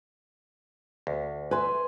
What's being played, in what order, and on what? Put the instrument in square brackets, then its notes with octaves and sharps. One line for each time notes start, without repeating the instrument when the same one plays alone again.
[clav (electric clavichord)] D2
[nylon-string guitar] B4 E5 [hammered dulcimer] G#5 C6